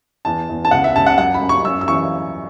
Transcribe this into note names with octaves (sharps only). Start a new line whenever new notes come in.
E2 A5
E2
A5
C#2 F#5
E5
C#2 A5
F#5
F#2 F#5
B5
F#2
C#6
F#2 E6
E6
E3 C#6